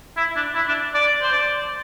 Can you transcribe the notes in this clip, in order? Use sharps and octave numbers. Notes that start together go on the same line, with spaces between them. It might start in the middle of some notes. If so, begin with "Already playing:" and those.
E4
D4
E4
D4
D5
C5
D5